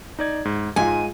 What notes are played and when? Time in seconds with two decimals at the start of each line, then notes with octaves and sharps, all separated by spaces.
0.19 D#4 D5 G#6
0.45 G#2
0.76 G#2 G#3 F4 G#5